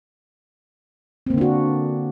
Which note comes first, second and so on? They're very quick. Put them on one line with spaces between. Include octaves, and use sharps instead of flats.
C4 A#3 D3 D4 F#4